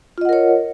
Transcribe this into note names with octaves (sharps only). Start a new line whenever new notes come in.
F4 A#4 C#5 D#5 F#5